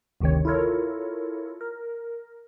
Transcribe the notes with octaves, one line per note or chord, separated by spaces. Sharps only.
G1 D2 C3 D#3 C4 C#5
E4 F4 A4 A#4 C#5
A#4